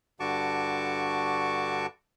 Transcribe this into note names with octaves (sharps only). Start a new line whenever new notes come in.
G2 D3 F#4 A5 C#6 D6